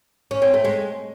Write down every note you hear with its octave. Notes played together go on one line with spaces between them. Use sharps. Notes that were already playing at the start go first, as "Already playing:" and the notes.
C#4
C4
A3
G#3